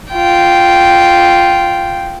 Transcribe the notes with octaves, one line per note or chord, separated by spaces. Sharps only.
F4 G5